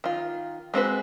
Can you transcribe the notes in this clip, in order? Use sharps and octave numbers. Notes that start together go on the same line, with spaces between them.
D#3 F4
G#3 C4 F#4 B4